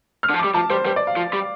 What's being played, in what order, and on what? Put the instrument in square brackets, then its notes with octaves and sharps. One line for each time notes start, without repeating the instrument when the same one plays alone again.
[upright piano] F6
[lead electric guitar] D3
F3
[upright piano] D6
[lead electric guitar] G3
[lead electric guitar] F3 [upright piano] A5
[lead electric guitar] G3 [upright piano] C5
[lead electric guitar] G3 [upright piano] C5
[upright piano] D5
F5
[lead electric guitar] F3
G3